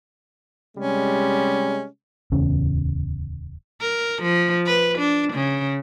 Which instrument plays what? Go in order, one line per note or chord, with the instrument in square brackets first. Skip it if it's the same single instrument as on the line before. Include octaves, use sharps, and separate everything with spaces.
[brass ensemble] C3 G3 G#3 [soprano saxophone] C#4
[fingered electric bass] D1 E2 C#3 C#4
[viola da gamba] A#4
F3
B4
D4
C#3